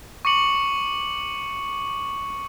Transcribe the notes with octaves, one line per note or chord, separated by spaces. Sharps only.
C#6 D6 C#7 F#7